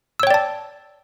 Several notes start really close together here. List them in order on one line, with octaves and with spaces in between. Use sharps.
E6 C#5 G5 D5 A5